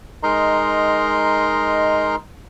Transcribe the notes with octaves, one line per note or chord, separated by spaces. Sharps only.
G#3 D#4 A#4 D#5 A#5 C6